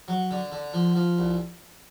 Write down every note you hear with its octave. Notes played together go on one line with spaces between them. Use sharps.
F#3
D3
D3
F3
F3
C2